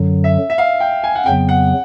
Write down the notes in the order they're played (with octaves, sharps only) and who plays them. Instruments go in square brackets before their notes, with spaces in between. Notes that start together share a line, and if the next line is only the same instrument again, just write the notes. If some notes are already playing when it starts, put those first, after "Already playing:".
Already playing: [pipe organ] F#2 D3 F#3
[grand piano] E5
E5
F5
G5
G#5
F#5
[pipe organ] F2 C#3 F#3 B3 [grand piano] G5
[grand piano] F#5